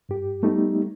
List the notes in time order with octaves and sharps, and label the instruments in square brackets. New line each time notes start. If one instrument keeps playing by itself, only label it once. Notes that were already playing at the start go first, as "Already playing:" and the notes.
[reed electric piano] G2 G4
G3 A3 B3 D#4 G4